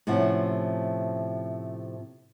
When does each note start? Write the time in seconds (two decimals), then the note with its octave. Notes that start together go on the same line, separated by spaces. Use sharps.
0.07 A2 C3 F3 C#4 F#5